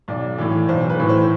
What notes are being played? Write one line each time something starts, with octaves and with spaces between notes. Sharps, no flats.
B1 D5
A2 E3
B1 C5
B4
A2 E3
C5